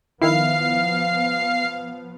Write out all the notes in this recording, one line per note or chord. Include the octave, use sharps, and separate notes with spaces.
D#3 F3 B3 E4 F5 C7